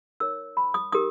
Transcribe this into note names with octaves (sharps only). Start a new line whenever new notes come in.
D#4 A#4 C#5 E6
B5
D#6
D#4 G4 A#4 D#6